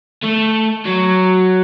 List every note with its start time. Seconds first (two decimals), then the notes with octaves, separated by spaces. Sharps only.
0.23 A3
0.86 F#3